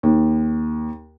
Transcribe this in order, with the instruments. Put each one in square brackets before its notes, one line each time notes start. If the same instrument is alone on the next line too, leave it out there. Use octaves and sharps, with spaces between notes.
[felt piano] D#2